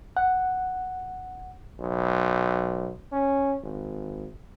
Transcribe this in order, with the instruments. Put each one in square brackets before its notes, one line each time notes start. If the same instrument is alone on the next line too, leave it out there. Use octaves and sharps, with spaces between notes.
[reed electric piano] F#5
[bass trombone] B1
C#4
G#1